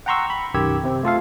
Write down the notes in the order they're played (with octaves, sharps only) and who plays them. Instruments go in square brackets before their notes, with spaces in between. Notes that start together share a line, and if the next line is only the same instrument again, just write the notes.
[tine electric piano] F#5 G5 A#5 C6 C#6 E6
B5
B1 F#2 D#3 G4 E6 G#6
C3 C4
A3 F4 A4 F5